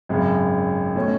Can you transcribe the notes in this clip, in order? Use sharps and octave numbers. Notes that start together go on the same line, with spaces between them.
G#1 F#2 C#3
B2 A3 C#4